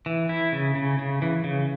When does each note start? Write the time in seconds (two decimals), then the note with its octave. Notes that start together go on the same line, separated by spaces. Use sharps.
0.06 E3
0.29 E4
0.52 C#3
0.75 C#3
0.99 C#3
1.22 E3
1.44 C#3